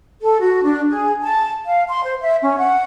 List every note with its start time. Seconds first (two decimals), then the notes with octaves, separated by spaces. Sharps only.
0.21 A4
0.39 F#4
0.64 D4
0.89 G#4
1.22 A5
1.66 F5
1.89 C6
2.03 C5
2.22 E5
2.42 C#4
2.58 F#5